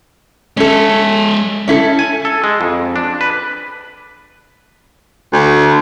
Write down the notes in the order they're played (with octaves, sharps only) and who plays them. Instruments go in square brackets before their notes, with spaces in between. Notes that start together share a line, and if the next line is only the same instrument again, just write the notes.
[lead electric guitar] G#3 E5 [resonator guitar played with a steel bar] C#4 A4
[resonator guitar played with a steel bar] C#4 E4 A4
[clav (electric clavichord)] G#5
A4
G#3
F2
D4
B4
[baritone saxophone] D2